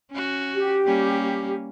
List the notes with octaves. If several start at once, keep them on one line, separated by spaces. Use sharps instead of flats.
C#4 F#4
G4
G3 A#3 C#4